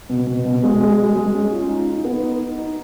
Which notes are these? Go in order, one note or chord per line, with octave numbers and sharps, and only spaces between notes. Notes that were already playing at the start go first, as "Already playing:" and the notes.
B2
B2
B2
G#3
G#3
G#3
G#3
C#4
F4
D#4
D#4
B3
D#4
D#4
D#4